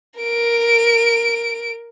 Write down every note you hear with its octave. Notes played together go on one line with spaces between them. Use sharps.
A#4 D7